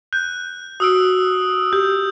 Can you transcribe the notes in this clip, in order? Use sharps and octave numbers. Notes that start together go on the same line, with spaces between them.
F#6 G6
F#4 D#6 E6 D7
G4 G6